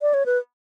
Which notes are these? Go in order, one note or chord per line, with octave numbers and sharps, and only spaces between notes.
D5
C#5
B4